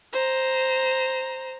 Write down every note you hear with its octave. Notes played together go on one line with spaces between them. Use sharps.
C5 A#5